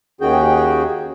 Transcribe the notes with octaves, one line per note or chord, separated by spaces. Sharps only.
D#2 D#3 C#4 F#4 G#4 G5